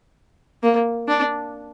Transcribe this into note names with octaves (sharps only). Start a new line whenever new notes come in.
A#3
D4